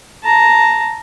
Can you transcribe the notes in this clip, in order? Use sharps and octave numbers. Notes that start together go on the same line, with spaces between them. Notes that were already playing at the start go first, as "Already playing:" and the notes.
A5 A#5